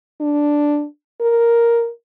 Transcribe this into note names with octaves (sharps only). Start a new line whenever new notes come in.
D4
A#4